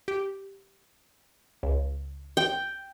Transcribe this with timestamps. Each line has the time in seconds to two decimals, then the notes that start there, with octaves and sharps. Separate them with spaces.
0.08 G4
1.63 C#2
2.37 G5